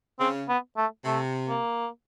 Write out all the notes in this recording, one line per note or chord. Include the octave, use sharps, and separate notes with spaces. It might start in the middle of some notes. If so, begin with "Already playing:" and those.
C#3 C4
B3
A3
C3 A3
A#3